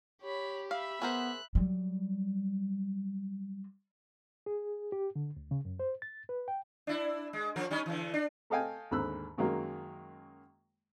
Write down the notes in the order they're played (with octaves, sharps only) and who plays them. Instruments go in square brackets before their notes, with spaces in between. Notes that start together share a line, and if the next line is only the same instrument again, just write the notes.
[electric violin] G4 [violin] C#5 B5
[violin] E5 B5 [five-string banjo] F5
[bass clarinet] B3 [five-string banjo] G#4 A#4 C5 [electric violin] F#6
[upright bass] F#3 G3
[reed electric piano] G#4
G4
D3
D2
C#3
F#2
C5
A6
B4
G5
[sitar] D4 E4
G#3
F3 D4 A#4
G3 C#4 D#4
D3 E3
D4
[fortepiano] A3 A4 D#5 F5 G5 G#5
D#2 G#2 D3 B5 E6 F#6
F#2 D#3 F#3 G#3 A#3